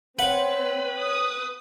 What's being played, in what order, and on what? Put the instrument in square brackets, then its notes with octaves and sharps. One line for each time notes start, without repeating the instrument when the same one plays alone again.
[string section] C4 [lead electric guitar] B4 [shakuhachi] C#5 [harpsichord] F#5
[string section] D#6